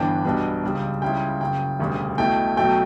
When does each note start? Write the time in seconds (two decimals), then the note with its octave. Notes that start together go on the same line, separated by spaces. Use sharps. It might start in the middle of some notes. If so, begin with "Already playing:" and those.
Already playing: G1 G2 E3 B3 D4 G5
0.24 B1 B2 G3 B3 D4
0.63 C#2 C#3 G3
1.02 C#2 C#3 G3 C#4 E4 G5
1.41 F#1 F#2 C#3 G5
1.79 E1 D2 C#3 G3
2.18 B1 B2 A3 E4 G5
2.57 B1 B2 F#3 A3 G5